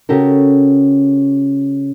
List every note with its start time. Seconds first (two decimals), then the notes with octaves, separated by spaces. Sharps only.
0.09 C#3 C#4 F#4 G4 A4 A#4